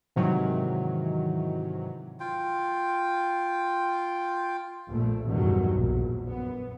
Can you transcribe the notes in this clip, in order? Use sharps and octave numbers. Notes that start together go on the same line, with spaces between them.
G#2 C3 D#3 E3 F#3
F4 G5
A#1 A3
A1 E2 G2 B2 D#3 F#3
A#1
F#2 B3